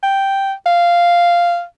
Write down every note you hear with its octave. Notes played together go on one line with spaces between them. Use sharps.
G5
F5